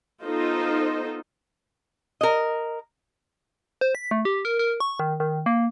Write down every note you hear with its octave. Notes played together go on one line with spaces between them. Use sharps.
B3 D#4 F4 A4 C5 D#5
A#4 D#5
C5
B6
A3
G4
A#4
A#4
C#6
D#3
D#3
A#3